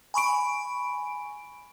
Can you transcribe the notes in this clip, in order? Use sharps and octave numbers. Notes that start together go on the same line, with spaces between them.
G#5 B5 C#6 D7